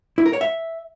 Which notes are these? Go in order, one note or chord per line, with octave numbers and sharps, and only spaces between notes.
E4
A#4
C#5
E5